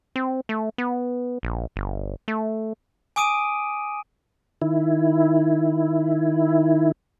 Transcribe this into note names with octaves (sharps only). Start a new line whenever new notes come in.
C4
A3
B3
A#1
G1
A3
G#5 D6 D#6 D7 D#7
D#3 E4